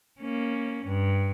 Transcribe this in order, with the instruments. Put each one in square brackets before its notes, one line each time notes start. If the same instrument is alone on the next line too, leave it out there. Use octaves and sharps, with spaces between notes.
[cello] A#3 C#4
G2